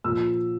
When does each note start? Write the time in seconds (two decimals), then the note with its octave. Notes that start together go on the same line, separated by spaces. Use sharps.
0.04 A#2 F3 E6